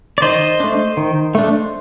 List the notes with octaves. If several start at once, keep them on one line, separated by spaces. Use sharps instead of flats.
D5
D#3 C5 D#5
A3 D4
D#3
A3 D4